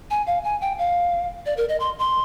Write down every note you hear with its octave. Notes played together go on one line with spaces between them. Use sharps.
G#5
F5
G#5
G5
F5
D5
A#4
D#5
C6
C6